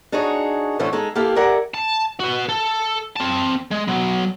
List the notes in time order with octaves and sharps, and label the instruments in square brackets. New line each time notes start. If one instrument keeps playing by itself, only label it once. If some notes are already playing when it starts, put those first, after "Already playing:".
[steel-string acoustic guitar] D4 D#4 F#4 G#4 C#5
D3 E3 F3 A3 B3 C#4
G#3 D#4 A4
A#3 E4 G4 A4 F5
A#4 D5 E5 F#5 G#5
[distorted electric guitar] A5
F#4 B4
A4
C4 A5
G#3
F#3 B3